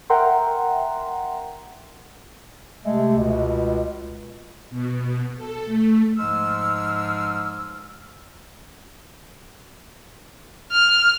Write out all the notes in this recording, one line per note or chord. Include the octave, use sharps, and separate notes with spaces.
A#4 E5 F#5 G5 A#5 C6
C3 G#3 A3
C#2 B2
B2
A4
A3
G#2 F3 G#3 E6 F6
F6